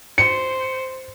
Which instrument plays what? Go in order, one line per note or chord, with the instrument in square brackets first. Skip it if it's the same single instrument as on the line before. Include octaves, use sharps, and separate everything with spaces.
[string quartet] C5 [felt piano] C#7